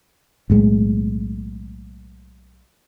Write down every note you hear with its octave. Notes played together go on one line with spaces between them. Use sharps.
B1 A2 G#3